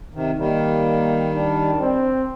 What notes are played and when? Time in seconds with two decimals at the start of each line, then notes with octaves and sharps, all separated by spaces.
0.15 C3 D#3
0.38 D#3 G3 A#3
1.34 D4
1.80 C4